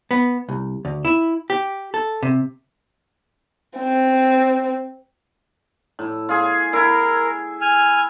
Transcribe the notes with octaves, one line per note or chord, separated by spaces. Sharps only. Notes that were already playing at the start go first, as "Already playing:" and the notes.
B3
C2
D2
E4
G4
A4
C3
C4
A2
F4 G#4
E4 A#4
G#5 F6